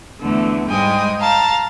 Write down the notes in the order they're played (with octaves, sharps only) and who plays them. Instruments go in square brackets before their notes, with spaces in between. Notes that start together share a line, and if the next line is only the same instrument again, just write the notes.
[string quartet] E2 D3 A3
G#2 G3 G#3 G5 G#5 D#6
F5 A5 A#5